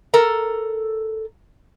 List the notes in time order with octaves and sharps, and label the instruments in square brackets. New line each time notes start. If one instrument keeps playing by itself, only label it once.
[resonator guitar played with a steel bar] A4 A#4 A#5